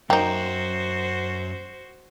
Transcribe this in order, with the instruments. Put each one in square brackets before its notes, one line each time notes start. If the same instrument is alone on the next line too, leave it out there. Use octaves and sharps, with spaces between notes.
[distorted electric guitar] F#2 [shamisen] A#3 D#4 [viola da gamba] F#4 C5 [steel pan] G5